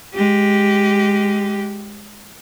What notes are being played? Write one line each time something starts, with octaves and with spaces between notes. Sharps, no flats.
G#3 G4